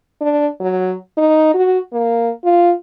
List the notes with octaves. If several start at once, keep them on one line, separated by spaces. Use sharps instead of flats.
D4
F#3
D#4
F#4
A#3
F4